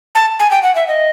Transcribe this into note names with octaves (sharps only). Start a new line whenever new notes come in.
A5
G#5
G5
F#5
E5
D#5